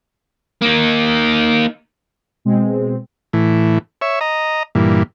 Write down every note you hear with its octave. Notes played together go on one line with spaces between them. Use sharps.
A#3 D#4
B2 G#3 C4
A2 E3
C#5 E5
D#5 A#5
G2 A#2 E3